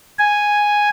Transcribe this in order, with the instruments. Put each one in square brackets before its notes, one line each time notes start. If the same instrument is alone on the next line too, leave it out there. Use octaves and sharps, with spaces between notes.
[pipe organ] G#5